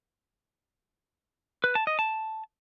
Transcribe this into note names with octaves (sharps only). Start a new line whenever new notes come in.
B4
A5
D#5
A5